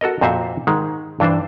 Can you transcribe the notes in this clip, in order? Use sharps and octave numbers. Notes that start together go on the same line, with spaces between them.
F#4 A4 A#4 D#5
F2 A#2 C4 F#4 C5 E5
G#2 D#3 G#3
G2 E3 D4 C5